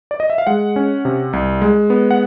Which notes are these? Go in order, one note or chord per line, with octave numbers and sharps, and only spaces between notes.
D5
D#5
E5
F5
G#3 F#5
C#4
C3
C2
G#3
B3
F#5